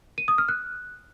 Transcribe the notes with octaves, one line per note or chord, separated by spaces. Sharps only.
D#7
D#6
F6
F#6